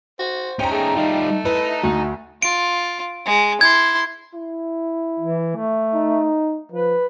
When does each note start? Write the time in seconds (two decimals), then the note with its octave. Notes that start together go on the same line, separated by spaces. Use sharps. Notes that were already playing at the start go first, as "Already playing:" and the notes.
0.19 F#4 C5
0.59 C#4 D#4 G5 A#5
0.71 A3 G#4
0.96 G3 D#4 F4
1.45 D#4 E4 B4
1.83 D2 F#4
2.42 F4 D7
3.26 G#3
3.61 E4 C6 G#6
4.34 E4
5.19 E3
5.56 A3
5.94 D#4
6.72 F3 B4